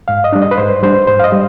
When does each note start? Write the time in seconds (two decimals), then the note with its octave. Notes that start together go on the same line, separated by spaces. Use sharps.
0.08 G#2 F5
0.24 D#5
0.33 G3 D4
0.42 D#5
0.51 B4
0.58 G#2 C5
0.83 G3 D4 C5
1.07 G#2 C5
1.20 F5
1.24 D#5
1.32 G3